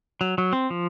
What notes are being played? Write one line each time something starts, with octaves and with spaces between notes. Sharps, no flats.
F#3
F#3
C4
F3